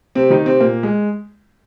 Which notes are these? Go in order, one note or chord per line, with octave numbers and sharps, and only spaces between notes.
C3 C4
D#3 D#4
C3 C4
A#2 A#3
G#3